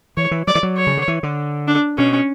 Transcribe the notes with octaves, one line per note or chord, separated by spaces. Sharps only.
E3 C#5
E3
F#3 D5
E3
F#3
C#5
C#3
D3
E3
D3
D4
B2 C#4